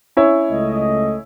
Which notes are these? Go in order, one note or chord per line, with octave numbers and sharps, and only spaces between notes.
C#4 E4 C#5
C#2 A3 D#5